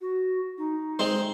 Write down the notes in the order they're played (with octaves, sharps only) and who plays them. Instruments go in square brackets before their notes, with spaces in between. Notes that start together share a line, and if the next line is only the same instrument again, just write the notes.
[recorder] F#4
D#4
[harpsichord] G#3 C4 C5